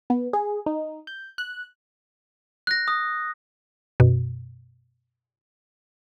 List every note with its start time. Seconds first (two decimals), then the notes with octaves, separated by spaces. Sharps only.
0.10 B3
0.33 G#4
0.66 D#4
1.07 G6
1.38 F#6
2.67 F#6 A#6
2.88 D#6
4.00 F#2 B2